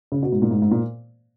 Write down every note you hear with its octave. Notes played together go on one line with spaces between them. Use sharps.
C#3
B2
G#2
A#2
G#2
G#2
A#2